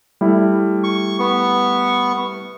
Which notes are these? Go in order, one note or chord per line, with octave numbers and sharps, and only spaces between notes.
G3 A3 E4
C#6
B3 C#6